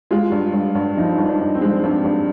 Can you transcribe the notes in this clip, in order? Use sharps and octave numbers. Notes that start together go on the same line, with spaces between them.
G#3 F4
G2
G2
G2
F3 D#4
G2
D4
G2
C4
G#3
G2 D4
G2